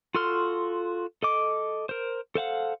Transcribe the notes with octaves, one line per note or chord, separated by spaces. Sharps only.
F4 F#4 A4 C6 F6
A4 D#5 D6
A#4 C5
A4 C5 F5 F#5